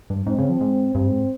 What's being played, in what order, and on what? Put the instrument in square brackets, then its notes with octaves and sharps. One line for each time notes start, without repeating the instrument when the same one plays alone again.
[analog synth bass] G2
[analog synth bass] G#2 [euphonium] C4
[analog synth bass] C#3
F3
G#2
[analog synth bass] G2 [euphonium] C4
[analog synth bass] G#2